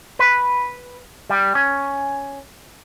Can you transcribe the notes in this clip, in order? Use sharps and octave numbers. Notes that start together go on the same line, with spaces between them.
B4
G3
C#4